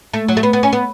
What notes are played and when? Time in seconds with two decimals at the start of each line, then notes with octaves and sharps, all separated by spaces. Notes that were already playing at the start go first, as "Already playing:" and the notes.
0.14 A3
0.28 F#3
0.37 A3
0.43 B3
0.53 B3
0.63 C#4
0.73 B3